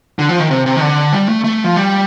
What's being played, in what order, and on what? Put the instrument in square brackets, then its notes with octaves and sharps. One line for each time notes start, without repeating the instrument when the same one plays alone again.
[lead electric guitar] D3
F3
D#3
C3
C3
D#3
D3
G3
A3
A3
F3
G3